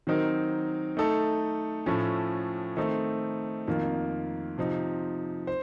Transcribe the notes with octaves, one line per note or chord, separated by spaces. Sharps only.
D#3 F#3 C4 D#4 A#4
A3 D#4 A4
A2 F3 A3 C#4 A4
D#3 A3 C4 D#4 A4
F2 D#3 A#3 F4
C3 F3 C4 D#4
C5